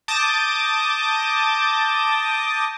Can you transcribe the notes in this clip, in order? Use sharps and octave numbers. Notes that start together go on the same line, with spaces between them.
A5 D6 D#6 G6 A6 A#6